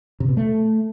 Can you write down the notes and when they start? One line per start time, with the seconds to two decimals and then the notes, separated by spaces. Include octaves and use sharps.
0.20 C3
0.29 B2
0.37 A3